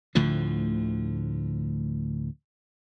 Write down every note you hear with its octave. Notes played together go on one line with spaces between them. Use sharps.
D2 A2 D3 F3